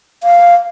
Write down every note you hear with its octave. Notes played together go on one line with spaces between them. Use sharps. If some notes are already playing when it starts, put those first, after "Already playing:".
F5